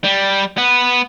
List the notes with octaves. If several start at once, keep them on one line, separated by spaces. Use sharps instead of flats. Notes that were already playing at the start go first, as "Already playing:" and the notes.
G3
B3